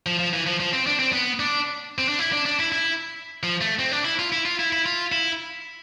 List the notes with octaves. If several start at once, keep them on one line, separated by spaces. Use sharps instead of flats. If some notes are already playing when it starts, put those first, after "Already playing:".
F3
F3
E3
F3
F3
C4
D4
C4
B3
D4
C4
D4
E4
D4
D4
E4
E4
F3
A3
C4
D4
E4
F4
E4
F4
E4
E4
F4
E4